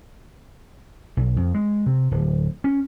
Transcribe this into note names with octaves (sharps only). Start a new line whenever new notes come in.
B1
F2
G#3
C3
D1
C#4